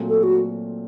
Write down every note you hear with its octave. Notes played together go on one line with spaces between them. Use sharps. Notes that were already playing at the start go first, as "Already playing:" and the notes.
Already playing: A#2 F#3 A3 C4
A4
F#4